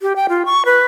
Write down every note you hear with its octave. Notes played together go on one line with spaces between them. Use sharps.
G4
G5
F4
C#6
B4